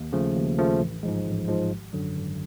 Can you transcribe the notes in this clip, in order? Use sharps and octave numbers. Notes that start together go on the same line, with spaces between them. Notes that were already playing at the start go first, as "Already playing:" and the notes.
Already playing: D#2
C#3 F3 A3
D#2
C#3 F3 A3
A1
G#2 F3 G#3
A1
G#2 F3 G#3
G#1
F#2 D3 F#3
G#1